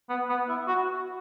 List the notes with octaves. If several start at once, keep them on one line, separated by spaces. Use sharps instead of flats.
B3
B3
E4
F#4